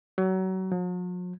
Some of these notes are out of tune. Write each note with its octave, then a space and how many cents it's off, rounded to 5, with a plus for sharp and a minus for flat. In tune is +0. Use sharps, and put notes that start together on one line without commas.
F#3 +30
F#3 -45